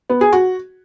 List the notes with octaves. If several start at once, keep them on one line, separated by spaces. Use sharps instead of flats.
B3
G#4
F#4